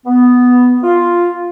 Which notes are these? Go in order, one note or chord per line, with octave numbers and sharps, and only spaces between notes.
B3
F4